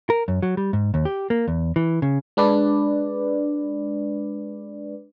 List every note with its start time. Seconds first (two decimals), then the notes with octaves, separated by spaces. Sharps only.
0.10 A#4
0.28 F#2
0.42 F#3
0.57 G3
0.73 G#2
0.94 D#2
1.05 G4
1.30 A#3
1.48 E2
1.76 E3
2.02 C#3
2.37 G#3 D4 B4 D5